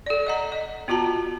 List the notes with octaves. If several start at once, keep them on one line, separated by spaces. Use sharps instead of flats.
A4 D5
D#5 F#5 A#5
D#5
B3 F4 F#4 A5 A#5